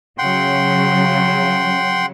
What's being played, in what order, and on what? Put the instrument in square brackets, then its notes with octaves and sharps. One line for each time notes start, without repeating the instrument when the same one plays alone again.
[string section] C#3 F#3 [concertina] F#5 G5 C6